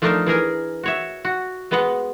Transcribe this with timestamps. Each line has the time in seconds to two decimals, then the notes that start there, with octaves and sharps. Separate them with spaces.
0.02 F3 A3 D4 D#4 A#4 F5
0.26 E3 G#4 A#4 G#5
0.83 F#4 C#5 E5
1.25 F#4
1.71 G#3 B3 B4 D#5 F#5